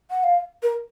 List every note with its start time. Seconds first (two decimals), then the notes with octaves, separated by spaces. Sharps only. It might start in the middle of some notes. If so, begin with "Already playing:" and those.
0.11 F#5
0.23 F5
0.62 A#4